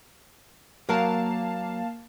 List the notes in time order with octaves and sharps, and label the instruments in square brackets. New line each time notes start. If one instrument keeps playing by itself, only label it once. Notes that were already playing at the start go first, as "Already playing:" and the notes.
[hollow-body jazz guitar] F#3 A#4 [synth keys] A#3 F5 A5